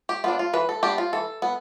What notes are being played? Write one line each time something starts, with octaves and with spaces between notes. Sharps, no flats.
G4
B3 D4 F4
F4
E3 B4
A4
B3 D4 G4
F4
E3 A4
B3